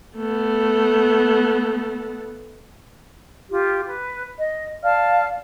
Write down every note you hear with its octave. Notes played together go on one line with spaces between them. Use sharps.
A3 B3
F4 G4
B4
D#5
D5 F5 A5 F6